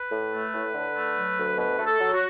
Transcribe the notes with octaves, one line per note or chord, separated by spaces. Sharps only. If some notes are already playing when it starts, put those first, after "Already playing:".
Already playing: B4
A2
A3
A2
D3
A3
F#3
D2
B2 B4
A3
A4
F#3
F#4